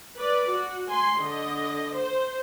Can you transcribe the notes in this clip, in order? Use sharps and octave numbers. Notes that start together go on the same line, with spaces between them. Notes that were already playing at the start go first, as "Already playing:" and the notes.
B4 D5
F#4
G#5 C6
D3 D#5
C5